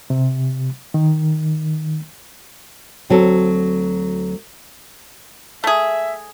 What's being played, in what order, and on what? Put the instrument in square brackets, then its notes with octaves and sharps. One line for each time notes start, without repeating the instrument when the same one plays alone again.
[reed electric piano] C3
D#3
[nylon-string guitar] D2 F#3 C4 A4
[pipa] A3 G#4 [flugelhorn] E5